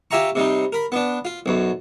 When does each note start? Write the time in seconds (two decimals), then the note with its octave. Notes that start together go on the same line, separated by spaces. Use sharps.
0.11 F4 G4 E5 G#5 A#5 C#6
0.35 C3 G3 D#4
0.73 A#4 B5
0.92 B3 D4
1.25 F4
1.46 B1 F#2